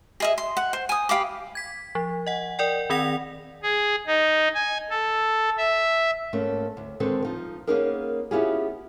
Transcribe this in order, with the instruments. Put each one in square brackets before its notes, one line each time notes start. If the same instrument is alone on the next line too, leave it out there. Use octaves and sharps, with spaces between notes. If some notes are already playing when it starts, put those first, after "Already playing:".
[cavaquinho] G#4 D#5 E5
C6
F#5
C5
G#5 D#6
G4 F5 B5 D6
[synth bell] G#6 B6
F3
D#5 F#5
A#4 D5 G5
D#3 C4 F#5 A#6 F7
[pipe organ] G#4
D#4
G#5
A4
E5
[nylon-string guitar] G#2 A3 A#3 C#4
D2
D3 D#3 G#3 C4 A4 B4
F3 D#4 F4
A#3 B3 C#4 D#4 G#4 A#4
B3 C#4 E4 F4 G4 G#4